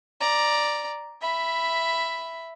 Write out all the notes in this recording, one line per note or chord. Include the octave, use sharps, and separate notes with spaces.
D5 A#5
E5 B5